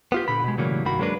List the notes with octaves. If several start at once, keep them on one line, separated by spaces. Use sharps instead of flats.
B3 F4 G4
A#2 D3 B5
B2 G#3
A2 C#3 E3 F#3 G3 A#3
C2 G2 D#3 A#3 F#4 B5
F#3 G#3 A#3 D4 B4